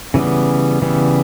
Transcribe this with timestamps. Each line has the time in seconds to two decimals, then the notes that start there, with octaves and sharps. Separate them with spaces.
0.14 C#3 E3 G3 B3
0.82 C#3 E3 G3 B3